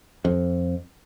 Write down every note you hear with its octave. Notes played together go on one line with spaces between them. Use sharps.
F2